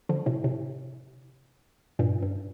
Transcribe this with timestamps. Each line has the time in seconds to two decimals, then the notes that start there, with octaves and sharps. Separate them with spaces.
0.09 D3 F3
0.26 A2 C3
0.44 A2 C3
1.99 G2 A#2
2.22 G2